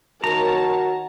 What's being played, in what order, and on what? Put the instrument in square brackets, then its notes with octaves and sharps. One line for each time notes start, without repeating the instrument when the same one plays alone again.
[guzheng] D#3 A#3 [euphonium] F#4 [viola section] A#4 C#5 A5 [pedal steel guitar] A#5